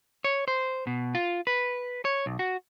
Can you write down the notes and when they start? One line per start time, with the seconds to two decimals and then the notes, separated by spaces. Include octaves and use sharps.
0.24 C#5
0.48 C5
0.87 B2
1.15 F4
1.47 B4
2.05 C#5
2.26 B1
2.39 F#4